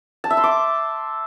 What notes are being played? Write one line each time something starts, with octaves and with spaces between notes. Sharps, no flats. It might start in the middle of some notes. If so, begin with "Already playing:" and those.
A5
E5
C6
D6